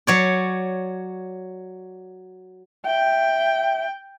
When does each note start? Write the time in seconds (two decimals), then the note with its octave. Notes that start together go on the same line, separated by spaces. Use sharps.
0.07 F#3 C#5 D5
2.86 E5 G5